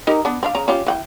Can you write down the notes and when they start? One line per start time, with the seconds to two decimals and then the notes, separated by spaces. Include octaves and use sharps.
0.07 D#4 G4 A#4
0.25 B3 D4
0.43 C4 D4 F5
0.55 C#3 A#5
0.68 C#4 F4 G4
0.86 E3 F#5 G5